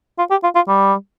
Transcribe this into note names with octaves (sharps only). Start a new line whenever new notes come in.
F4
G4
F4
F4
G3